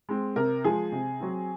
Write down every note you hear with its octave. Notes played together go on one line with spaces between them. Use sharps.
G#3 C4
C3 A#4
F3 G#3 G#4
C3
F#3 C4